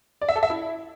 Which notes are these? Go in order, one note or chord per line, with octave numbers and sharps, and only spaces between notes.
D5
E5
A4
E5
E4